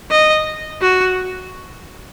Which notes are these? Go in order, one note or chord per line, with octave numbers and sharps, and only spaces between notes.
D#5
F#4